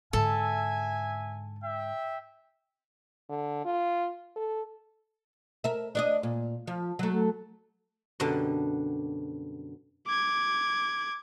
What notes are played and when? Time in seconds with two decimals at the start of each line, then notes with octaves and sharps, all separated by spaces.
0.13 G#2 D3 A4 E5 G#5
1.62 E5 G5
3.29 D3
3.65 F4
4.36 A4
5.64 A#4 E5
5.95 D4 D5 D#5
6.23 A#2
6.67 F3
6.99 F#3 A3
8.20 F#2 B2 D3 G3 D4
10.07 D6 G#6